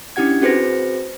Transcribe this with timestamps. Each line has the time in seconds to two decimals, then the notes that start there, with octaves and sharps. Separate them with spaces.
0.16 C#4 D4 E4 G4 F#5 G#6
0.41 C4 F#4 G#4 B4 C5 A#6